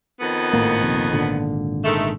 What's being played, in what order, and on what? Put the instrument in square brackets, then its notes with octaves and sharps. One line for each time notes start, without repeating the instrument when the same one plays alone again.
[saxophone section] F2 D#3 B3
[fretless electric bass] G#1 A2 A#3
A#1 D#2 C3
G#1 A#2 D3
[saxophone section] D#3 G#3 A3